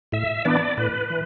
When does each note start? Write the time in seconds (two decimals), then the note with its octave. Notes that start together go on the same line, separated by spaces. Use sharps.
0.12 A2 E5
0.45 E3 B3 D4 D5
0.77 A2 B4
1.10 E3